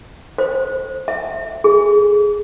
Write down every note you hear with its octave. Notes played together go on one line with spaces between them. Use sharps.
C5
E5
G#4